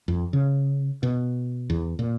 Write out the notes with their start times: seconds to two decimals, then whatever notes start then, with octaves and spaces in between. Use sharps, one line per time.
0.08 F2
0.33 C#3
1.03 B2
1.70 E2
1.99 A#2